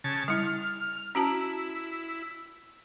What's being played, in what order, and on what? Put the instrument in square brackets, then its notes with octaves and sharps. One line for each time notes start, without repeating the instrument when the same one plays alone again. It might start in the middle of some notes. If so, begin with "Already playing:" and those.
[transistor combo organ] C#3 A5
[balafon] G3 E4 [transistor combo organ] F6
[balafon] C#4 F#4 A5 [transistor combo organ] E4